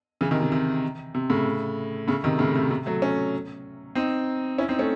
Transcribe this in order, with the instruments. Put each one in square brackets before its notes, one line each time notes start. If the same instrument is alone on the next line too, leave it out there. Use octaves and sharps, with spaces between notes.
[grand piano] C#3 E3
C3 D#3
C3
C3
C3
A2 C#3
A2 C#3
C3 D#3
A2 C#3
C3
C3
F#3 A3
A3 C#4
C4 D#4
C#4 E4
C4 D#4
A3 C#4